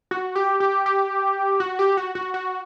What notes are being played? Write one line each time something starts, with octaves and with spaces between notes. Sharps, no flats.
F#4
G4
G4
G4
F#4
G4
F#4
F#4
F#4